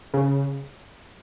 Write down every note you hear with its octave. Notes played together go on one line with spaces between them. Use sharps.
C#3